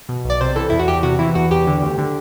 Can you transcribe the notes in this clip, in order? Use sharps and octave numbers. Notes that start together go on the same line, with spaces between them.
B2
B1
D5
C3 C5
E3 A4
E2 E4
F#4
E2 G4
C3 F#4
E3 E4
E2 F#4
E2 G4
D3
D2
D3